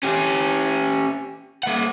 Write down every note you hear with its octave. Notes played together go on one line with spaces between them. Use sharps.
C#4 G4
A#3 F#5